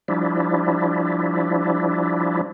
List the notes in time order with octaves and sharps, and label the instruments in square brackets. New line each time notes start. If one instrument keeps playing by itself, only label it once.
[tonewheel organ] F3 G3 D4 E4